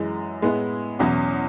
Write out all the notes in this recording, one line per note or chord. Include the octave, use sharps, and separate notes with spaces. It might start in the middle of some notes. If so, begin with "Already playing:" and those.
Already playing: F#2 E3 G#3
A2 G#3 B3 E4
E2 B2 F#3 C#4 E4